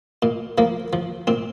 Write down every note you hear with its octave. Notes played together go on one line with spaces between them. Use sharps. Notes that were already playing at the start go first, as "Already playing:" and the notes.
A#2
F3 A#3
F3
A#2 C4